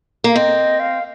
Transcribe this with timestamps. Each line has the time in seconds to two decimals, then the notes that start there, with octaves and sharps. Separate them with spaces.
0.24 A#3 F5
0.35 C4 D#5
0.80 F5